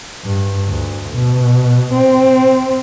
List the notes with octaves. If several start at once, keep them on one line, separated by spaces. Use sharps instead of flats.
G2
D2
B2
C4